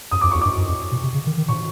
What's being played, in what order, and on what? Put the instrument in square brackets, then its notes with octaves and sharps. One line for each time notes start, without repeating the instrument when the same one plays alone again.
[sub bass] F#2 [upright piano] D#6
[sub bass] F2 [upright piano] D6
[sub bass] E2 [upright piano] C#6
[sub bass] G2 [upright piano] D6
[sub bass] F#2
F2
B2
C3
C#3
D#3
D#3
[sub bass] A#2 [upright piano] C#6